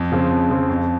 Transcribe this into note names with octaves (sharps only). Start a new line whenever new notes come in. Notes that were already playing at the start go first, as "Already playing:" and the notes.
Already playing: F2
C#3 F3 C4
F2
C#3 F3 C4
F2